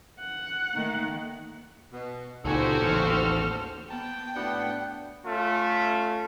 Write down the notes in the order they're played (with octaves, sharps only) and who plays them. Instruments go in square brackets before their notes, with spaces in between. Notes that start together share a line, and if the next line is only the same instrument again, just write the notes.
[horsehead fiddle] F#5
[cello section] D#3 A3 A#3
[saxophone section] B2
[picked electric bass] C#2 A#2 [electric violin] D#4 G#5 [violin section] F#4 G4 C5 [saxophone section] A4
[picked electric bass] A1 D#2 [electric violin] F6
[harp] B3 A5 [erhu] G5
[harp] A2 E4 F#4 [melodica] B3 F#5 [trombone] D4
[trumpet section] A3 C#4 F4